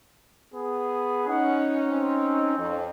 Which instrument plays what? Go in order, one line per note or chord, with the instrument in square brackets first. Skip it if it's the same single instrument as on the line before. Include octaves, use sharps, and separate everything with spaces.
[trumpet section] B3 G#4
[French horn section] C#4 D#4 [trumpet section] F#5
[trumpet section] C4
[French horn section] F2